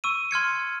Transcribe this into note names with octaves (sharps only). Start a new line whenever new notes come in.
C#6 E6 D#7
C6 F6 G#6 C#7